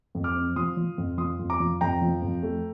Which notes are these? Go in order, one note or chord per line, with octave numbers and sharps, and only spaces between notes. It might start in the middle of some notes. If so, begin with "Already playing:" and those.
F2
D6 F6
C4
F3 C6 D#6
F3
F2
F3 C6 D#6
F2
A#5 D6
F3
F2 G5 A#5
F3
F2
A3